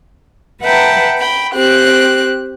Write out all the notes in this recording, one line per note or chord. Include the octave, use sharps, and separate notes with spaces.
B4 E5 F#5 G5 A5 A#5
G5 B5
C4 G4 F#6